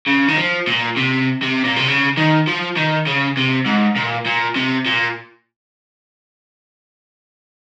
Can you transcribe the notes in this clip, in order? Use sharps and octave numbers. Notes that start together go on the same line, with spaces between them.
C#3
D#3
F3
A#2
C3
C3
A#2
C3
C#3
D#3
F3
D#3
C#3
C3
G#2
A#2
A#2
C3
A#2